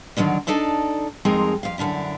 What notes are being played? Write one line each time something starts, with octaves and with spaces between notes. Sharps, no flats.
D3 D#3 F#3 A#3 D4
D4 D#4 A4 D5 A5
F2 G#3 C4 D#4 G#4 A#4
F2 F5
F#2 D3 D4 E4